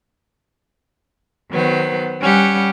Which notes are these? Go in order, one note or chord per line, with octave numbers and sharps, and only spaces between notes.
D#3 F#3 B3 C5
G3 C#4 G4 F#5